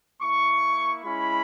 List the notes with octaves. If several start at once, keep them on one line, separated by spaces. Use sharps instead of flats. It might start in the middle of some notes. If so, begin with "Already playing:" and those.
A#3 E4 C#6
G#3 C#4 E4 B5